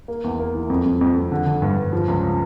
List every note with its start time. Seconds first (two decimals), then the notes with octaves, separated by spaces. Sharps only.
0.08 A#3
0.24 E2
0.39 A#3
0.54 E3
0.70 F2
0.86 F2
1.01 F2
1.16 F2
1.32 D3
1.46 D3
1.62 G2
1.77 G2
1.93 F3
2.08 C#2
2.23 C#3